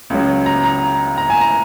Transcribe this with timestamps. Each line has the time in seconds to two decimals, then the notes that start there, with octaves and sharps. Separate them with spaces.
0.10 C#2 C#3 F#3
0.46 A#5
0.64 A#5
1.18 A#5
1.30 G#5
1.41 A#5